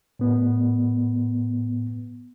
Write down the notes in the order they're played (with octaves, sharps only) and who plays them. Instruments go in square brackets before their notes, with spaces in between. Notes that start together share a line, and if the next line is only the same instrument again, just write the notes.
[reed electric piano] A2 B3